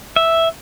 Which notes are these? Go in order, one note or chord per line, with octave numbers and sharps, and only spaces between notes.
E5